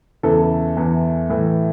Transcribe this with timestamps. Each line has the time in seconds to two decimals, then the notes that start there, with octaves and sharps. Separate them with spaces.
0.23 E2 C#3 E3 A4
0.77 E2 E3
1.30 A2 E3